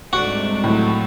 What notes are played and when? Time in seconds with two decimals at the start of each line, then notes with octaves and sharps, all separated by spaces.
0.13 C2 G#2 A3 D4 F#4
0.64 A2 F3 F#3 A3